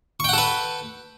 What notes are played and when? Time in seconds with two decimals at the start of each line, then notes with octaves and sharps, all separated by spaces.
0.20 C#6
0.24 G5
0.29 F#5
0.33 A4
0.38 B4